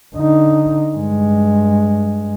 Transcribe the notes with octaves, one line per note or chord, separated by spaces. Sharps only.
D3 D#4
G2 G#3